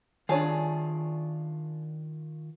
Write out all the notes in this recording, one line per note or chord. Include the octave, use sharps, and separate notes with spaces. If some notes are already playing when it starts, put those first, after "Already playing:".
D#3 D4 F4 G#4 C#5 D5 G#5 A5